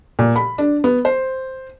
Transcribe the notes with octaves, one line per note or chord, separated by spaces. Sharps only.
A#2
B5
D4
B3
C5